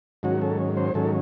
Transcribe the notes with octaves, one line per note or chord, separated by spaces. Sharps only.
G#2 D#3 F#3 C#4 F#4
A4
C5
G#2 D#3 F#3 C#4 A4